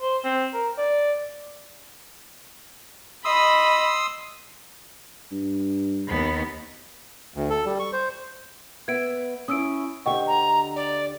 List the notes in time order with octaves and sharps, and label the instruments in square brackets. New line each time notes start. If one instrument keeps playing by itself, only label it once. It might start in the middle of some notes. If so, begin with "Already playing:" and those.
[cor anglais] C5
C4
A#4
D5
[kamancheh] D#5 B5 [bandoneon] C6 D#6 E6
[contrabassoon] G2
[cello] D#2 B3
[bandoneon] D2
A4
G3
C#6
C5
[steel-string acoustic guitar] B3 E5 [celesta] G#6 D7
[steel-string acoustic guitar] C#4 E4 [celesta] D#6 E6 D7
[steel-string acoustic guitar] D2 D3 G4 [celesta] D#5 F#5 G5 [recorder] C#6
[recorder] A#5
D5